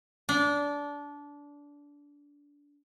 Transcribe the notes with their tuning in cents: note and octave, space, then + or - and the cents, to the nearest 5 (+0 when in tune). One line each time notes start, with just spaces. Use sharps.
D4 -20